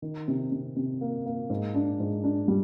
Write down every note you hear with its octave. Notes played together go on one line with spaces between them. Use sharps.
D#3
C3
C3
C3
A#3
A#3
G#2
D4
G#2
D4
G3